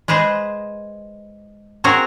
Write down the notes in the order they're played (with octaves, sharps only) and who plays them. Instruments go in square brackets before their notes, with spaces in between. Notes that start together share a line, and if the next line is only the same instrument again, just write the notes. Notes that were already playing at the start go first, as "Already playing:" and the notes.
[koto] G#3 G#4 B4 C5 D#5
C4 C#4 F#4 G#4 A#4 C#5